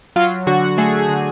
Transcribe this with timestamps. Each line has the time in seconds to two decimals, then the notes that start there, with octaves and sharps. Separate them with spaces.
0.16 F#3 F4
0.47 D3 F#4
0.78 A3 G#4
0.99 G#4
1.09 D3